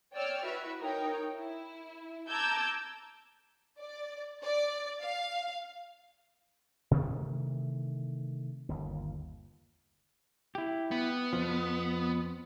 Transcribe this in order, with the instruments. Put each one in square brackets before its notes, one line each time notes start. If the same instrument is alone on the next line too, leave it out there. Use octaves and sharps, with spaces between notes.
[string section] C#5 D5 G5 E6 F6
E4 F#4 B4 E5
D#4 A#4 C#5 G5
E4
A5 A#5 D6 E6 G6 G#6
[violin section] D5
D5
F5
[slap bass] C3 D#3 E3 A3
G1 D#2
[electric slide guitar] E4 G4
[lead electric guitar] B3
[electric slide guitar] F2 F3